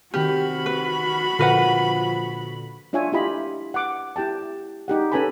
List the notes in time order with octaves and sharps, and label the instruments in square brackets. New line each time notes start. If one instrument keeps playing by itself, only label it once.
[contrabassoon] C3 [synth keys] D#3 F6 [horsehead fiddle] F#4 B5 [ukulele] G4
[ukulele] B4
[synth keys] A#2 D3 [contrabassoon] F3 [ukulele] A#4 B4 F#5
[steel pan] D4 F4 C#5 E5 G#5
E4 F4 G4 D#5 G#5 B5
F#5 D6
E4 G4 G5 A5
D#4 G4 F#5
C#4 A4 B4 G#5 A5 B5